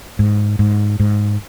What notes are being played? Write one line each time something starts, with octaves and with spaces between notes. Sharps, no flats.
G#2
G#2
G#2